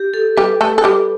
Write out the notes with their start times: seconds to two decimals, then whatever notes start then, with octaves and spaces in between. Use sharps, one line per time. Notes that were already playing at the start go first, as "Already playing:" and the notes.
Already playing: G4
0.14 A4
0.37 G3 G4 B4
0.61 A3 A4
0.78 A4
0.84 G3 G4